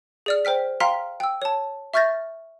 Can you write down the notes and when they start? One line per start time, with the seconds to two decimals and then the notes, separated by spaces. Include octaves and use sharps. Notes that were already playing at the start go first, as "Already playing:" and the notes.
0.26 G#4 D5 F6
0.45 C5 G5 F6 B6
0.80 F5 G5 A#5 C6 F6 B6
1.20 G5 E6
1.42 C#5 A5
1.94 E5 C#6 F6 G6 A6 A#6